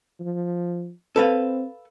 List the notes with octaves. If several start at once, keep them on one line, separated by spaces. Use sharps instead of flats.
F3
C4 A4 B4 F5